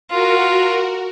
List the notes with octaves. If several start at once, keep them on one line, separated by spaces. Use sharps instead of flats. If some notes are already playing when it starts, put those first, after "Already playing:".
F4 F#4 A#4